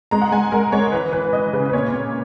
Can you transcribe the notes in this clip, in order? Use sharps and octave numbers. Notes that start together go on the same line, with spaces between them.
G#3 A#5
F#5
G#3 G#5
G#3 A#4
G#3 C#5
E3 B4
E3 B4
E3 D#5
C#3 B4
B4
A#2 C#5
A#2